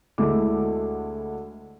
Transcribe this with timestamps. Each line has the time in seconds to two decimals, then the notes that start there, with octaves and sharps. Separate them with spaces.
0.18 D2 G#3 A3 E4 D6